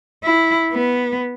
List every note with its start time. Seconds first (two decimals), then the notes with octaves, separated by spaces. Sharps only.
0.24 E4
0.73 B3